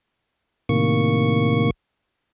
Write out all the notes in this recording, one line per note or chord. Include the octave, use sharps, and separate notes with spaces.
A2 C3 D#3 A#3 C#6